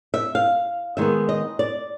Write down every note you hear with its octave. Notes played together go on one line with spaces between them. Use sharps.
E5
F5
D#3 G#3 B3 E5
D#5
D5